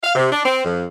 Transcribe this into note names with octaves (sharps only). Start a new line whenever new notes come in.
F5
C3
D4
C4
F2